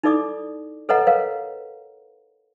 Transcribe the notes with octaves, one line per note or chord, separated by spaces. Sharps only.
D#4 E4 A4 D5 D6 D#6
A4 B4 C#5 D#5 F#5 A#5
A#4 B4 C#5 F5